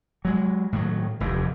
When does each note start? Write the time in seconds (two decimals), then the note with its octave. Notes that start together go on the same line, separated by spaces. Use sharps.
0.25 F#3 G#3
0.73 A2 D#3 F#3
1.20 F1 E2 G2